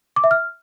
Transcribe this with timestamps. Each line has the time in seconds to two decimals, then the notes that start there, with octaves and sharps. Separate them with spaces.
0.16 D6
0.24 E5
0.31 F6